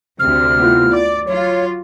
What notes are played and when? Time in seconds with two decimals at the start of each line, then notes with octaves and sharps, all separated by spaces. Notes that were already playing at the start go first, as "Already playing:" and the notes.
0.19 D2 C3 F6
0.60 B3 E4 F4
0.93 D5 D6
1.27 F#3 F4 C#5